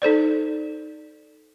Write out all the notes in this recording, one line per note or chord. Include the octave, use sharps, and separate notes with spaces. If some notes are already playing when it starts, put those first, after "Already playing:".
D#4 A4 C5 D5